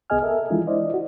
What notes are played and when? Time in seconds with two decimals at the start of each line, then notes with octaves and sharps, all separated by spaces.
0.10 C2 B3 G#4 D#5 G#5 F6
0.22 A4 A#4 E5
0.50 E3 G#3 D4 E4 F4
0.67 E4 C5 D5 D#5
0.94 F#4